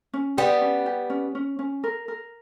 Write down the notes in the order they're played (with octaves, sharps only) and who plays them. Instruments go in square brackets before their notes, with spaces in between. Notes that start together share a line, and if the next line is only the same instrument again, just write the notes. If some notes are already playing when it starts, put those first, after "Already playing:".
[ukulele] C#4
[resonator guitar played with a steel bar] G3 B3 [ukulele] G4
[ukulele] C#4
G4
C#4
C#4
C#4
A#4
A#4